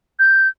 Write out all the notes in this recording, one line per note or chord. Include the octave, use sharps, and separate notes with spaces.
G6